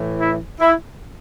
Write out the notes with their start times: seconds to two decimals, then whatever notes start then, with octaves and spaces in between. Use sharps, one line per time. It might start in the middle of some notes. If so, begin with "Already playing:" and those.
Already playing: A2 E3
0.20 E4
0.60 E4